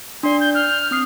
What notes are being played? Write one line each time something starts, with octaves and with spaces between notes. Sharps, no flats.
D4 D5 C6
G6
F6 G6
C4 D#6 C7